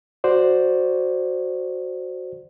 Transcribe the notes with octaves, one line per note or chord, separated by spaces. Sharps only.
F#4 C5 D5